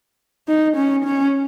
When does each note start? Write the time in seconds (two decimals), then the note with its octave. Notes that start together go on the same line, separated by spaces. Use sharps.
0.48 D#4
0.76 C#4
1.05 C#4